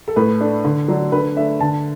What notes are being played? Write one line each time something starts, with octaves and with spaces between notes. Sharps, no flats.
A4
A2 B4
A3 D4
D3
F#3 D4
D3 B4
A3 D4 E5
D3 A5